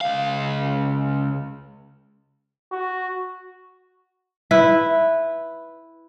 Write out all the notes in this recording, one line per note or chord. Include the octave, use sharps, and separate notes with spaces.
C#2 F5
F#4
E4 B4